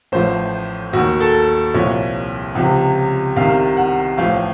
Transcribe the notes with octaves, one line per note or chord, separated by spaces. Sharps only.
A1 A2 F3 C5
D#2 D#3 F#4
A4
C2 A#2 F3 C#5
C#2 C3 F3
C2 C3 D#3 F5
F#5
A1 A2 F3 F5